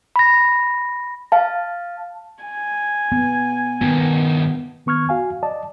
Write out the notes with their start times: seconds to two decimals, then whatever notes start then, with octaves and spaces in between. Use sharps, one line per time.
0.16 B5 A#6
1.32 F5 A5
2.44 G#5
3.12 B3
3.81 G2 D#3 B3
4.86 D#3 B3 C#6 F6 G#6
5.09 F#4 F5 G#5
5.43 D5 D#5 A5